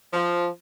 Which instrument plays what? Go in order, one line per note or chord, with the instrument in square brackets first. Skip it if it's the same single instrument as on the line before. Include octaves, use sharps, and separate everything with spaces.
[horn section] F3